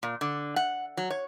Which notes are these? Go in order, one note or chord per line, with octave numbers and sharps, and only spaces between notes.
A#2
D3
F#5
F#3
C#5